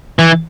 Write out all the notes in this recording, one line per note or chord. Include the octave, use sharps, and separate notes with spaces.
E3